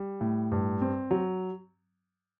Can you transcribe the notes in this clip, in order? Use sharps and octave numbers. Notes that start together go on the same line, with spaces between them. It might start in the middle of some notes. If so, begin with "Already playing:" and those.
Already playing: G3
A2
G2
C4
F#3